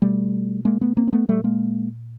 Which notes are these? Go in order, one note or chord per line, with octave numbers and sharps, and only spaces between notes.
B2 G3 A3
G#3 A#3
A3 B3
A#3 C4
C4
A3 B3
A#2 G3 A3
G#3 A#3